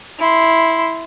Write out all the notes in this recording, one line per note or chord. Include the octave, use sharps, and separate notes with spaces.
E4 C6